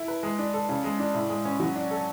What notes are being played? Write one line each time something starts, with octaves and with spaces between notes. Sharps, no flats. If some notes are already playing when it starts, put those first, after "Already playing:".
Already playing: E4 A4
B4
G#3
D4
A4
C#3
G#3
D4
A2
G#3
C#4
F#3
D4
A4